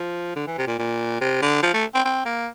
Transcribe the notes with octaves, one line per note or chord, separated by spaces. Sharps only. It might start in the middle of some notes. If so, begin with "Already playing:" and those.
Already playing: F3
D3
E3
C3
A#2
A#2
C3
D3
F3
A3
C4
C4
A#3